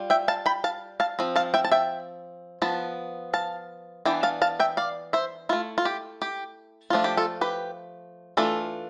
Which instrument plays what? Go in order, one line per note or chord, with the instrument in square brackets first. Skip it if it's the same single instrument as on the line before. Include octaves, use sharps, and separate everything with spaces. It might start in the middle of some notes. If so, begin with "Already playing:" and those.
Already playing: [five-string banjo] G3 F4
E5 G5
F5 A5
G5 B5
F5 A5
F5 A5
F3 C4
F5 A5
E5 G5
A5
E5 G5
F3 B3 A5
F5 A5
E3 B3 D4 G5
F5 A5
F5 A5
E5 G5
D5 F5
C5 E5
A3 E4 F4
F4
G4
G4
F3 A3 D4 F4
G4
F4 A4
G4 B4
E3 A3 D4 F4 A4